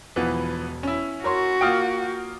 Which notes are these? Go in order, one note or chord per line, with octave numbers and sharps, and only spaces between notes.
E1 E3 F3 B3
C#4 E4
F#4 A#4 C#5 C6
A#3 F4 G5 D#6 F6 D7